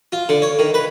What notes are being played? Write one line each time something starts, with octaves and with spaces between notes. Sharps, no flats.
F4
D3
C#5
D#3
B4